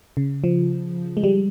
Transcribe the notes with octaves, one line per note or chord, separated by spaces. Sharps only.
C#3
F3
G#3
G3